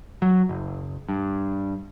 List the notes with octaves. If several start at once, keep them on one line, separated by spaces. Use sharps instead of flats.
F#3
F#1
G2